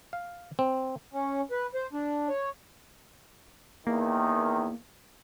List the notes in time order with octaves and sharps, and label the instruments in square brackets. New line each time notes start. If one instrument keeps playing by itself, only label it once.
[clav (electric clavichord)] F5
C4
[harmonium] C#4
B4
C5
D4
C#5
[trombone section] E2 D#3 [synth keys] A#3